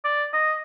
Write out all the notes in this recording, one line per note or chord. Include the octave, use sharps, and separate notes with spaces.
D5
D#5